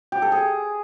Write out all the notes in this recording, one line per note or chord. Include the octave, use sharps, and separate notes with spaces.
G4
A4
G#4